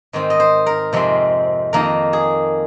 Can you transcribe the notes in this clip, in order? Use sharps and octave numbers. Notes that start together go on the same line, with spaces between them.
G#2 D#3 C4
D#5
C5
A#4
F2 C3 G#3 C4
F2 D#3 A#3 A#4
G#4